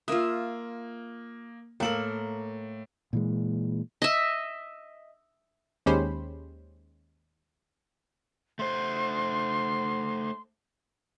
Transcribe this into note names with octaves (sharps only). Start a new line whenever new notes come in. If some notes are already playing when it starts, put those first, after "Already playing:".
A#3 F4 E5 D#6
A2 A#3 A4 A#4 F#7
A#2 E3 G#3
D#5 E5
D#2 G#3 C#4 G4 C5 B5
A3 C5 C6